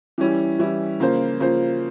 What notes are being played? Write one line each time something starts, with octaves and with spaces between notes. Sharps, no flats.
E3 G3 C#4 E4
E3 G3 C#4 E4
C#3 F3 A#3 F4 C5
C#3 F3 A#3 F4 C5